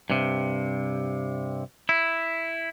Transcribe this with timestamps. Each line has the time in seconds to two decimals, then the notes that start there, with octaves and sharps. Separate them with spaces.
0.10 G2 C3
1.89 E4